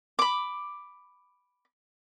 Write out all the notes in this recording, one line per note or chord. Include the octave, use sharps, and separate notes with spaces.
B5 D6